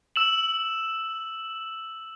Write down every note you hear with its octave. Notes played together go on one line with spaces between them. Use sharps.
E6 E7 F#7